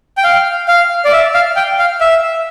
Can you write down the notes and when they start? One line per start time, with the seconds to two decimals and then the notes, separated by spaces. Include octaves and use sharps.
0.18 G5
0.24 F5
0.68 F5
1.05 D5
1.13 E5
1.34 F5
1.56 G5
1.79 F5
2.01 E5